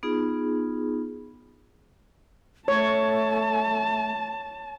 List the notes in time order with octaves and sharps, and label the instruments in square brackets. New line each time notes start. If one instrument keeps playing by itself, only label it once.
[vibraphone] B3 D#4 F4 G#4
[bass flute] A3 [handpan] C#5 [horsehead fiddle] A5